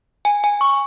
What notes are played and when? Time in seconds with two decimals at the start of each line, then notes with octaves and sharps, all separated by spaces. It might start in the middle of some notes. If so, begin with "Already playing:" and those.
0.25 G#5
0.44 G#5
0.61 C#6